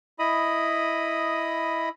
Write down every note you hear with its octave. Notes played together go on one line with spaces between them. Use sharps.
E4 D#5 B5 D#6